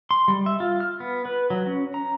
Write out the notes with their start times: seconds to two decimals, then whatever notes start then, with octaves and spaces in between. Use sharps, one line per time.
0.11 C6
0.28 G3
0.46 E5
0.60 F4
0.80 F6
1.00 B3
1.25 B4
1.50 F#3
1.66 C#4
1.94 A#5